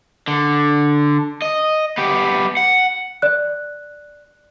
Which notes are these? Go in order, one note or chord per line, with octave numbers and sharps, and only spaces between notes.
D3
D#5
B3 G4
F#5
D5 F#6